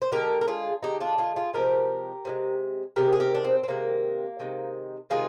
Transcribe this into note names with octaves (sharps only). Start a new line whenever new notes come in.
C5
D3 G#3 G4 A#4
A#4
F4 G#4
D3 G#3 D#4 G4
D4 F4
F4 G#4
F4 G#4
C3 F3 G#3 G4 A#4
C3 F3 G#3
C3 D#3 G#3 G4 A#4
G#4
G4 A#4
D4
C4
C4
C3 D#3 G#3 A#3
C3 D#3 G#3
C3 D#3 G#3 F4 G#4